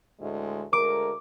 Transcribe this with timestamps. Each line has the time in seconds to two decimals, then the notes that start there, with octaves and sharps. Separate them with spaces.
0.20 D2 A2 G#3
0.73 D2 G#3 A#4 D6